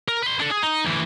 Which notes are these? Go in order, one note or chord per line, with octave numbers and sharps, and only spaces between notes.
A#4
B4 C6
D4 A4
G#4
D#4
D2 E3